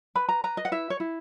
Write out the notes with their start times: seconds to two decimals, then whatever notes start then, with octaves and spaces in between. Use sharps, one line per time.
0.15 B4 B5
0.29 A#5
0.44 B4 A#5
0.57 D#5
0.65 F#5
0.72 E4 E5
0.90 C#5
1.00 E4